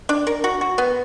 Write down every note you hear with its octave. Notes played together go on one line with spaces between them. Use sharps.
D4
A#4
F#4
F#4
B3